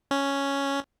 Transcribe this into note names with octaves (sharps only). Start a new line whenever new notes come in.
C#4